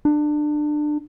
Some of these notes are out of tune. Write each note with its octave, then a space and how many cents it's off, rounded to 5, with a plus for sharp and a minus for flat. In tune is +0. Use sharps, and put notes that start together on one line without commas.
D4 +25